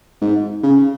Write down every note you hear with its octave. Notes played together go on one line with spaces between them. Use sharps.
G#2
C#3